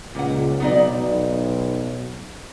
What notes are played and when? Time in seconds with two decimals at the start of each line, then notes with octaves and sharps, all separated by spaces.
0.15 C#2 A#2 F#5
0.60 B1 B3 D#4 D5
0.94 B1